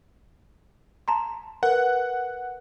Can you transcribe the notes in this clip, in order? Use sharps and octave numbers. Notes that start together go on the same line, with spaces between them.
A5 A#5 C6
A#4 B4 F#5